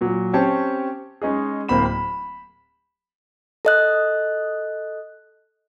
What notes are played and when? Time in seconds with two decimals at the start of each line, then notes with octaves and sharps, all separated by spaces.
0.01 A#2 F#3
0.33 C4 C#4 G4 C#5 A5
1.22 G#3 C#4 D#4 G#4
1.68 D1 A#3 C4 B5 E7
1.86 B5
3.65 A4 D#5 F#6